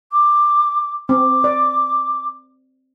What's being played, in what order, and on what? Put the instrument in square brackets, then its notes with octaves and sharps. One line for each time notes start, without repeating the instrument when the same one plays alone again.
[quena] D6
[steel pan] C4 [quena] D6
[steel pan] D5